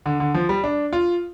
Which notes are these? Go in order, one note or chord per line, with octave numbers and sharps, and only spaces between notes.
D3
D3
F3
G3
D4
F4